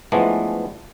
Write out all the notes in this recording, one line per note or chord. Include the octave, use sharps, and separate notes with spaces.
E3 F3 G#3 A3 B3 D4